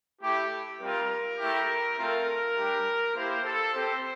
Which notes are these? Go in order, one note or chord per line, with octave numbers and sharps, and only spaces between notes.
A3 E4 G4
G3 C4 F4 A#4
A3 E4 G4
A3 C4 F4 A#4
G3 D4 G4
A#3 E4 G4 C5
A4
C4 G4 C5